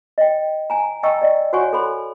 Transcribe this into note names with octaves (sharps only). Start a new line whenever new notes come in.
D#5 G5
G#5 A#5
D#5 G5 A5 A#5 C#6 E6
D5 D#5
F#4 C5 C#5 F#5 G#5 C#6
A4 C5 B5 C6